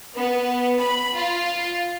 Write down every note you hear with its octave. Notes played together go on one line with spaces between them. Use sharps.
B3
B5
F4